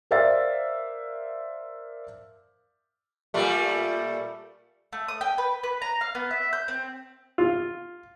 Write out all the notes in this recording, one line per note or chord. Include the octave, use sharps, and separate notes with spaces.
A#4 C5 D5 E5 F5 A6
A#2 G3 A3
A3
D#6
G5
B4
B4
A#5
F5
B3
E5
G6
C4
F4